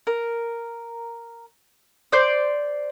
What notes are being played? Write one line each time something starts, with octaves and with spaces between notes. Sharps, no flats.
A#4
C5 D5